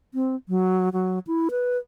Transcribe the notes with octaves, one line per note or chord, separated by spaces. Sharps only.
C4
F#3
F#3
E4
B4